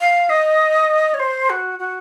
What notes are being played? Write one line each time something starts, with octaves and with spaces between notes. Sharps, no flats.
F5
D#5
C#5
C5
F#4
F#4